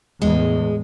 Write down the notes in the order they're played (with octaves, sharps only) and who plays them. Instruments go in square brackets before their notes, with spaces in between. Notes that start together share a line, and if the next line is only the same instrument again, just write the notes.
[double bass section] E2 A2 [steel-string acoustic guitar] G#3